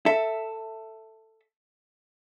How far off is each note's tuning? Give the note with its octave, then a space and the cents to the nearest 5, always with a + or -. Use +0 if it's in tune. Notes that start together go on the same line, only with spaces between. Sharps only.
A4 +10 E5 +0